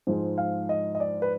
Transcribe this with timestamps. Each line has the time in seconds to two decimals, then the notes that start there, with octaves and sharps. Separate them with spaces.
0.07 G#2 F3 G#3
0.38 F5
0.69 D#5
0.95 D#5
1.00 D5
1.22 B4